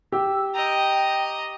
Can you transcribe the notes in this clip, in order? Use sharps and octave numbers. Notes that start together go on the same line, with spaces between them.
G4 E6
D#5 G5 A#5